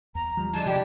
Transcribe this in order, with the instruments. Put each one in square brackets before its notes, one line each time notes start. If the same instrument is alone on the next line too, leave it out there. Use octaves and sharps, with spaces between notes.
[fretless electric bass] E2 [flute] A#5
[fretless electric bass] F3 G3
[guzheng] E3 G#3 D4 [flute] A5
[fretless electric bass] C3 [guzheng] G3 A3 D4 [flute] G4